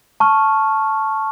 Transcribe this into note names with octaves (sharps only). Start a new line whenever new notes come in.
A5 C#6 F6